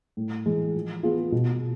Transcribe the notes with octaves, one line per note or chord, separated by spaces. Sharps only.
A2
E3 G#3
F3
B3 F4 G#4
B2